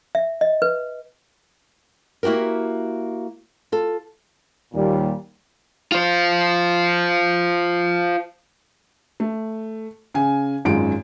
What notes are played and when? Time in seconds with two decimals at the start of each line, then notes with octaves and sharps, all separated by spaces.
0.15 E5
0.41 D#5
0.62 B4
2.23 A#3 E4 F#4 G4 A#4
3.72 F4 A4
4.74 D#2 A#2 G3
5.92 F4 C5
9.20 A3
10.15 C#3 G#5
10.65 G#1 F#2 G#3 F4 D7